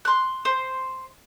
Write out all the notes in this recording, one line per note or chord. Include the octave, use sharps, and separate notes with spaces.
C6 F#6
C5